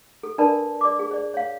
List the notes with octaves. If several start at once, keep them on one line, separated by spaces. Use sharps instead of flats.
A4
D4 A#4 B4 D5 A5 B5
D5 D6
G#4
C5 D5
C#5 F5